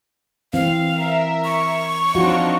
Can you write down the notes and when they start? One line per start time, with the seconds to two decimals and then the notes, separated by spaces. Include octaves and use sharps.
0.53 E3 C4 F5
0.95 A#4 E5
1.45 C#6
2.15 F3 C4 D4 D#4 F4 F#4